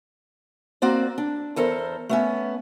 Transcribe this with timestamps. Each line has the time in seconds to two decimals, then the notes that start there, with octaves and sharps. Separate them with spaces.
0.82 A#3 C4 F#4 D5
1.18 D4
1.56 E2 A4 A#4 C5
2.09 A3 B3 C#4